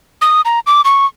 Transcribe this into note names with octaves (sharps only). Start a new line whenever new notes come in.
D#6
A#5
D6
C#6